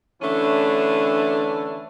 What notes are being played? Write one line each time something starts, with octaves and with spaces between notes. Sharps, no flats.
D3 E3 A3 C#4 D4 E4